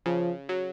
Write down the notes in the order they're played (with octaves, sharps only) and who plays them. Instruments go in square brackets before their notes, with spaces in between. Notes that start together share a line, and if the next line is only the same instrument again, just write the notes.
[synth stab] C#3 [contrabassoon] F3
[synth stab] F#3